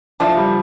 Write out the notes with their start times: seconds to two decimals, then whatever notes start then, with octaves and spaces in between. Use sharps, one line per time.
0.20 F3 A3 D4 F4 A4
0.37 G3